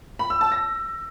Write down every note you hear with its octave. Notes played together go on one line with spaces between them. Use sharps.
B5
E6
A5
A#6